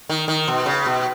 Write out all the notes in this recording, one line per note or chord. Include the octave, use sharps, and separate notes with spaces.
D#3
D#3
B2
C#3
B2